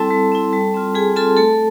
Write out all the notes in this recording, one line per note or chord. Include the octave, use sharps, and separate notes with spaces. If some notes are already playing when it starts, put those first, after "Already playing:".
Already playing: G3 C4 E4 A4 A5
G3
C4 E4
G3
C4 F4
G3 G#4 G#5
C4 F4 A4 A5
A3 A4 A5